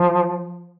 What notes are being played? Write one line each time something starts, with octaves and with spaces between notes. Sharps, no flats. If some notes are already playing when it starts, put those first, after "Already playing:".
Already playing: F3